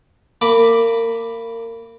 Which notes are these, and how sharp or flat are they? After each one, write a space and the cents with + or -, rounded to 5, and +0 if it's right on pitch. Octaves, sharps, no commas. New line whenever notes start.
A#3 -30 B5 +0 D6 +0